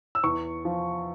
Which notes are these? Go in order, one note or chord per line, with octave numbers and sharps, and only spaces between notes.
E6
E2 C#6
F3